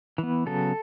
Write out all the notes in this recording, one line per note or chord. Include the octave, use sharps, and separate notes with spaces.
E3
B3
C#3 F#3 B3 A4